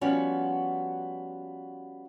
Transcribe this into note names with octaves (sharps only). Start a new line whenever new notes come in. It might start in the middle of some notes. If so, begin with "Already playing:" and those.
F3 G3 B3 C#4 F#4